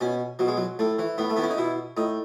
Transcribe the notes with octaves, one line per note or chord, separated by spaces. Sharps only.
B2 C#4
B2 F#3
G#3
F#3
A2 A3
E3
A2 B3
A3
E3 B3
C#4
D#4
B2 E4
A2 D#4